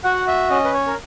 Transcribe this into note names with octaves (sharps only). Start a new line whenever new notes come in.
F#4 F#5
E5
C#4 D#5
B4
C#5
A#4